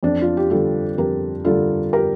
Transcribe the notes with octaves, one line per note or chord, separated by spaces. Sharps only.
F2 D4
F4
G4
D3 G3 F4 A4
F2 G4 A#4
D3 G3 F4 A4
G4 A#4